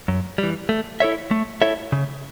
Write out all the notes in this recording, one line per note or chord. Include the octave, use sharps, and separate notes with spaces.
F#2
E3 G3
A3
E4 A4 C#5 E5
A3
E4 A4 C#5 E5
C#3